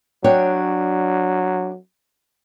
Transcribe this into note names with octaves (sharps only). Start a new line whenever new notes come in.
F#3 D4 C#5 G5